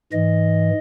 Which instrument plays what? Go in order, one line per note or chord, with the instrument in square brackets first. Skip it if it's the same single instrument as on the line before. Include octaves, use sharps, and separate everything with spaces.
[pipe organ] G#2 E3 D#5